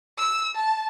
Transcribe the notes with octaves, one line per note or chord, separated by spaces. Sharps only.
E6
A5